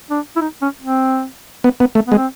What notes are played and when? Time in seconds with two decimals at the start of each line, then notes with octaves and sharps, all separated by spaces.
0.10 D4
0.36 E4
0.41 D#4
0.62 C#4
0.82 C4
1.64 B3
1.80 B3
1.95 A3
2.07 G#3 B3
2.17 C4